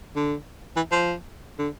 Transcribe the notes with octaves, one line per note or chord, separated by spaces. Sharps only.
D3
E3
F3
D3